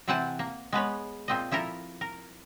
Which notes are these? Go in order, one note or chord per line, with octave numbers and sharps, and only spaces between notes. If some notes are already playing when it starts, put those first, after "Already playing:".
C3 E3 C4 F#5 G#5 A5
A#3
G#3 B3 B4 C#5
A#2 C4 D#5
F3 E4 A4 A#4
A#4